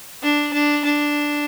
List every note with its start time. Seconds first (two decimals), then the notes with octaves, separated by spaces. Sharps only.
0.22 D4
0.53 D4
0.84 D4